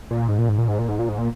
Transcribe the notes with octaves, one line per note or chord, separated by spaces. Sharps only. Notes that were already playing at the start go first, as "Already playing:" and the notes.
A#2
G#2
A#2
G#2
A#2
G#2
A#2
G#2
A#2
G#2
A#2